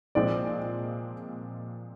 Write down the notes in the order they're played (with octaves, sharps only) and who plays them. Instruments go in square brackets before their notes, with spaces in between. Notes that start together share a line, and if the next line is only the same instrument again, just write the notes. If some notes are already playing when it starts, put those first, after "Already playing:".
[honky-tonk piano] A#2 F3 G#3 C4 [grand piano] D5